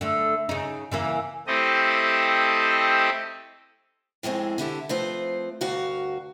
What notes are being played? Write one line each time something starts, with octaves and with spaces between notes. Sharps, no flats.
D3 A3
C#3 D#4
C#3 E3 A#3
A3 C4 E4 G4 A4 D#5
F2 A2 G#3 A3 C4
D3 E4 G4 A4
F3 A3 C4 B4 C5
D2 G2 F#4 A#4 F5